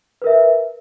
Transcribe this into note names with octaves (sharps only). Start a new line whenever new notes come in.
A#4 B4 E5